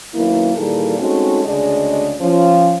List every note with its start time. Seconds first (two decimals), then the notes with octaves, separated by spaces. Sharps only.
0.14 F#2 D#3 A#3 B3 E4
0.55 A#2 D#3 E3 G3 G#4 A4
0.98 G#3 A3 C4 C#4 D#4 F#4
1.44 D2 C#3 G#3 D4 D#5
2.21 F3 C#4